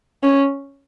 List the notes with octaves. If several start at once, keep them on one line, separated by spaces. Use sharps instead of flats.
C#4